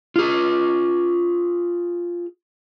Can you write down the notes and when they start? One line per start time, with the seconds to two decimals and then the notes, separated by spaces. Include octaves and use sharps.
0.16 F4 G#4